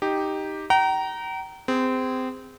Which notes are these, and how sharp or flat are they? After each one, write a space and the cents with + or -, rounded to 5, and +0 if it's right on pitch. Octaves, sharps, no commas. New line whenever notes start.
D#4 +0 G4 +0
G5 -40 A#5 +0
C4 -25 G#4 -25